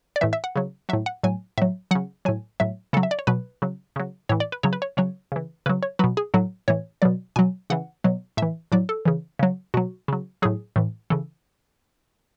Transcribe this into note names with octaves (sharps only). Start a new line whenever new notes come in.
D5
A2 E3 E5
E5
F#5
C#3 F#3
A2 F#3 E5
F#5
A2 F#3 G#5
A2 F#3 E5
C#3 F#3 F#5
A2 F#3 G#5
A2 F#3 E5
C#3 F#3 A4
E5
D5
C#5
B2 F#3 B4
C#3 F#3
C#3 F#3
A2 E3 C#5
D5
B4
C#3 F#3 C#5
B4
C#5
C#3 F#3 C#5
C#3 E3
C#3 F#3 B4
C#5
B2 F#3 B4
G#4
A2 F#3 A4
A2 E3 C#5
B2 F#3 D5
B2 F#3 G#5
C#3 E3 F#5
B2 F#3
A2 E3 E5
A2 F#3 D5
A4
C#3 E3
C#3 F#3
B2 F#3 F#4
C#3 F#3
A2 F#3 G#4
A2 E3
C#3 E3 A4